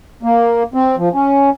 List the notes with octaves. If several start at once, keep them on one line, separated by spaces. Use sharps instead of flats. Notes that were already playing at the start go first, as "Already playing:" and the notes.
A#3
C4
F3
C#4